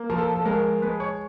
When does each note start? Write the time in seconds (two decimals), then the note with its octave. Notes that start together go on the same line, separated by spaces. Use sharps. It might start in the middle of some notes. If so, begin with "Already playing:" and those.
Already playing: A#3
0.10 F3 A#4
0.18 A4
0.36 A4
0.45 G#3 A#4
0.82 G#3 B4
1.00 C#5